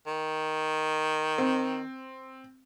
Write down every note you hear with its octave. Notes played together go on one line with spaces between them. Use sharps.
D#3
C4